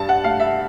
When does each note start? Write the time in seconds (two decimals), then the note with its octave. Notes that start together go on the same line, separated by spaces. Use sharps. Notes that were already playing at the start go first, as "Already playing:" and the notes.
Already playing: G2 A5
0.09 F#5
0.24 A3 F5
0.40 E5